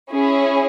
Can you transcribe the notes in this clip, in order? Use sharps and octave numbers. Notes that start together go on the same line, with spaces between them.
C#4 E4 G#4